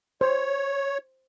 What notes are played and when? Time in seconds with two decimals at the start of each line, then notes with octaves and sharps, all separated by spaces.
0.21 C5 C#5